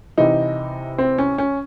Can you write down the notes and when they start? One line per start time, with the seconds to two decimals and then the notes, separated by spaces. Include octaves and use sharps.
0.18 C3 E3 D#4
0.98 C4
1.18 C#4
1.38 C#4